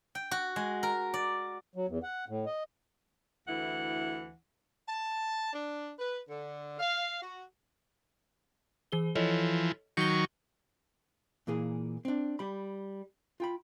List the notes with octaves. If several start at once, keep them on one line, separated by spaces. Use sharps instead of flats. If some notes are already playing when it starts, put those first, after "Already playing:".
G5
F#4
G#3
A#4
D5
F#3
E2
F#5
A2
D#5
D2 E3 E4 F#5
A5
D4
B4
D3
F5
F#4
E3 G#4 G7
E3 F3 A4 C#5 D#5
D#3 F#3 C#6 G6 G7
A#2 E3 A#3 G#4
C4 D4
G3 B5
F4 G5 B5